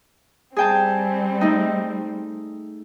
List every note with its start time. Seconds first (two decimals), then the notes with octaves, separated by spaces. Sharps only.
0.56 G3 C4 G#4 G5 A5
1.41 A3 D#4